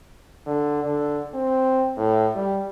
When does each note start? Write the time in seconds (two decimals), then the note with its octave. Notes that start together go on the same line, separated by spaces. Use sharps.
0.46 D3
0.84 D3
1.34 C4
1.97 A2
2.35 G3